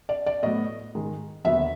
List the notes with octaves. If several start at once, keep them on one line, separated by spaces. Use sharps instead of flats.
D5
D5
A2 F#3 B3 D#5
G#2 D#3 G#3
D#2 D3 F#3 B3 E5